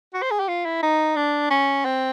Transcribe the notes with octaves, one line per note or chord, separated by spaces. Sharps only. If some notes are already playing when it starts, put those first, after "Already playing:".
F#4
C5
G#4
G4
F4
E4
D#4
D4
C#4
C4